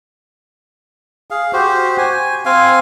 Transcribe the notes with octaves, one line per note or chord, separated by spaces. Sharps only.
G#4 F5
F#4 G4 C5
G#5
C4 F5 G#5